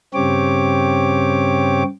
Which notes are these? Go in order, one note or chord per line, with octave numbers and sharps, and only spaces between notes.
G2 C#3 C4 G4 C#5 D6